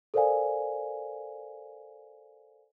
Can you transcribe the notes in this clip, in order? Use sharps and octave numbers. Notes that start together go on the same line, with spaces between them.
A4 A#4 C5 D5 F5 G#5